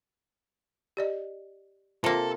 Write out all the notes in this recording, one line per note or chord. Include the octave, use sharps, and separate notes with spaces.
G4 D5 D#5
C3 A#3 F4 A4